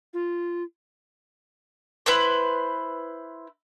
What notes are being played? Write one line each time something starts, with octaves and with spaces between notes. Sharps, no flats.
F4
E4 B4 C5